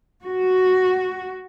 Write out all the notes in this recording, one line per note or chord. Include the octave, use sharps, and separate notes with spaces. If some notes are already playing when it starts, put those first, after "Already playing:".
F#4